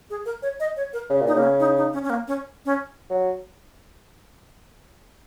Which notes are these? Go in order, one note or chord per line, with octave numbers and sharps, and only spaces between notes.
G#4
A#4
C#5
D#5
C#5
A#4
C#3
A#2
D#4
C#3 A#3
C#4
D#4
D#4
C#4
C#4
A#3
C#4
C#4
F#3